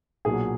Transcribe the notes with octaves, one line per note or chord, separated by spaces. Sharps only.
B1 A#2 F#3 G#4